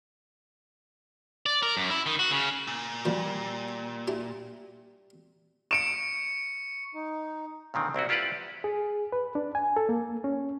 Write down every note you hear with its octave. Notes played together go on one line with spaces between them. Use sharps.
D5
A#4
F#2
E4
D#3
F#4
C#3
A#2
D#3 F3 G3 A#3
D4 E4 G4
C#6 C#7 D7 E7
D#4
A#2 D3 D#3 C4
C2 C4 E4 F#4
E4 F4 G4 B4 D5 F#5
G#4
B4
D4
G#5
A4
A#3
C#4